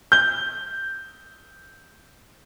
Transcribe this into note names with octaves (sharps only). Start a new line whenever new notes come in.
G6 G7